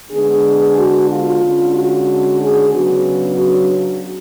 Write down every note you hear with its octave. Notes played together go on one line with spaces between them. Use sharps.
D3 G#3 B3 D4 G#4
F#4
F4
D3 G#3 C#4
F#4
G#4
C#3 F#3 B3 D4 F#4
F#4